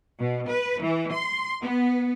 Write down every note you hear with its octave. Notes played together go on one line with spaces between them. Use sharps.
B2
B4
E3
C6
B3